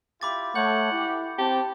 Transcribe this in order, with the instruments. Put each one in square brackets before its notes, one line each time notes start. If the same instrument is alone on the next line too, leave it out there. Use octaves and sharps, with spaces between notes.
[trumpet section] E4 F4 G4 [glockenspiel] B5 D6 A6
[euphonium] A3 [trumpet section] A4 C#5 [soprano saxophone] F#5 [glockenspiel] G6
[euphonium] E4 [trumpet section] G4
[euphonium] C4 [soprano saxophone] G4 [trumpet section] A5